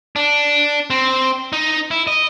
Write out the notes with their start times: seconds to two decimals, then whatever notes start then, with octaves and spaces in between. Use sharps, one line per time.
0.16 D4
0.90 C4
1.53 D#4
1.91 E4
2.07 D#5